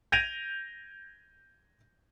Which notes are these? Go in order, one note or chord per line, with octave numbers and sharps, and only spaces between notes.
G6 G#6 A#6 D7 D#7 F7